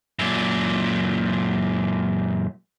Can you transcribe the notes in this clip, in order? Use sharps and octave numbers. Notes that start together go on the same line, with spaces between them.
F#2 A#2